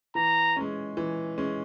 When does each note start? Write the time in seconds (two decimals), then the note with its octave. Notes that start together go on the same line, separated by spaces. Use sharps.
0.15 E3 A#5
0.56 G#3 C#4
0.97 E3
1.38 G#3 C#4